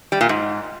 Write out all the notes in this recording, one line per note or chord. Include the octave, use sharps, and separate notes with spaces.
G3
A#2
G#2